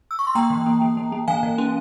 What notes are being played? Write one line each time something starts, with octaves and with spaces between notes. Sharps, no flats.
E6
C#6
C6
A#3 G5 A#5
E3
A#3
A#3
A#3
A#3
E3 F5 G#5
E3
C#4